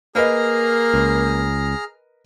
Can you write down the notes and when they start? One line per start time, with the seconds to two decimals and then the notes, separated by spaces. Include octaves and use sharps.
0.15 A#3 G#4 A#4 B4 D#5 A#5 F6
0.94 C#2